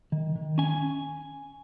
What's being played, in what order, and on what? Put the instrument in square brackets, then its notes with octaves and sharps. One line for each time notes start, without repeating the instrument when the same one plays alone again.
[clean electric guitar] D#3
D#3
C#4 G#5